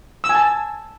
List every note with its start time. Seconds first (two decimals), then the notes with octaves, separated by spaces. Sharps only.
0.24 E6
0.29 G#5
0.35 A5